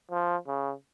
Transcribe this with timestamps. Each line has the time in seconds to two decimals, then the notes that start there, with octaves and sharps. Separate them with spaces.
0.11 F3
0.47 C#3